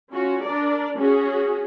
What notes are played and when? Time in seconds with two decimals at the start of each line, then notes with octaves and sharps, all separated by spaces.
0.13 C#4 F4 F#4
0.43 D4 A#4 D5
0.98 C#4 F#4 G#4